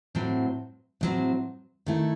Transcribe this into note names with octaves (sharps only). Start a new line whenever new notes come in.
A2 F#3 C4
A2 F#3 C4
D#3 A3 E4